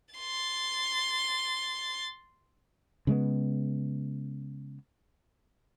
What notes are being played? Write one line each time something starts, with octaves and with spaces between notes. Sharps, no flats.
C6 A6
C#3 G#3 A3 B3